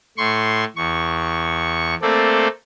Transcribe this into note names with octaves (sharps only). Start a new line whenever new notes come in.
A2 C6 C#6
E2 C#6
A3 A#3 C4 A4 D5